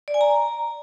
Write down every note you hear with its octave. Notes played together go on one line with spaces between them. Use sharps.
D5
G#5
A#5